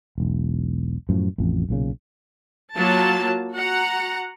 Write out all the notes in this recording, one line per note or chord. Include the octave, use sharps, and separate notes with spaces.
E1 B1
F#2 A2 F3
A1 F2
B1 A#2 C#3
F#3 A#3 F4 A5
F#4 F#5 A#5